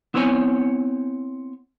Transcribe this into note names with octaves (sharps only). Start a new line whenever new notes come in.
B3 C4 E4 C5 C#5 G#5